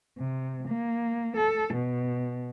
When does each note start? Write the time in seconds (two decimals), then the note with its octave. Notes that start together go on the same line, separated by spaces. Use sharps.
0.18 C3
0.68 A#3
1.37 A4
1.74 B2